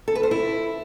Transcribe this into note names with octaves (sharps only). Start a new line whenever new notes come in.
A4
B4
C5
E4